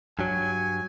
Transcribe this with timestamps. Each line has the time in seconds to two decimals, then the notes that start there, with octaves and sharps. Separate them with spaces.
0.19 G2 F#3 G#5